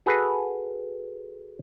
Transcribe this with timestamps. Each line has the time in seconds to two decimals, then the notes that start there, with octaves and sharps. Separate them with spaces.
0.06 F#4 G#4 A4 B4